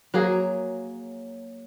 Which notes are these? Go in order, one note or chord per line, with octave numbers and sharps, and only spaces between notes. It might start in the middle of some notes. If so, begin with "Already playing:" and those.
F#3 A#3 G#4